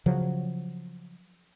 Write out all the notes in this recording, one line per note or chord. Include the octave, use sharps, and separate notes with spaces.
C#3 F3 F#3